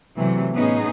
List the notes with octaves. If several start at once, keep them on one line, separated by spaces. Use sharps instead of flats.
C3 E3 F#3 A3
A2 B3 C#4 D#4 G#4